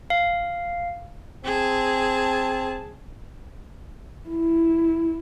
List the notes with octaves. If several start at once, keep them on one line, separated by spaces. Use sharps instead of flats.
F5
C4 G#4 A5
E4